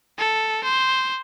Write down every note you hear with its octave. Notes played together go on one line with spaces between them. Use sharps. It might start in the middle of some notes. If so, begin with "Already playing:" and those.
A4
C5